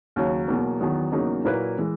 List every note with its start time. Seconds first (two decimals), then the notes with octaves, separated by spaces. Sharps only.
0.16 D#2 C#3 F#3 C#4
0.48 E2 B2 F#3 A#3
0.80 E2 D#3 F#3 B3
1.12 E2 C#3 F#3 A#3 D#4
1.45 A#2 F#3 A#3 E4 B4
1.78 E3 G#3